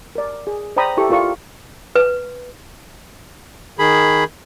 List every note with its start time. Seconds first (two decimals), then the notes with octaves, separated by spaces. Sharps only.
0.16 A#4 D5
0.47 G#4
0.77 C5 D5 G5 A#5 B5 D#6
0.97 E4 G4 A4 C#6
1.09 E4 F4 A#4 D5 C#6
1.95 B4
3.79 D#3 G#4 B5